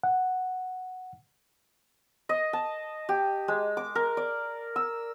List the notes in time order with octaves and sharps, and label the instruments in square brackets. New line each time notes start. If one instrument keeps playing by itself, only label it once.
[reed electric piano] F#5
[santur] D#5
A5
G4
G#3
D6
A#4
D5
E6